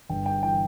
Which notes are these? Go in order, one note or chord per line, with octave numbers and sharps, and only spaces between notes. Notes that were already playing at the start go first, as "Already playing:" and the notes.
G1 G5
G5
E3 G5